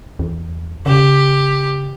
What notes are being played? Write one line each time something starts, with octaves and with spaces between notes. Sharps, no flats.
E2
C#3 G4